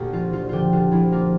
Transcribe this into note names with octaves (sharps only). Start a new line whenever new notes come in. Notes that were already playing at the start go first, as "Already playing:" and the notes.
Already playing: D2 A#2 A#3 G4
F3 F4
F3 F4
D3 F4 G4
D3 F4
F3 E4
A#3 F4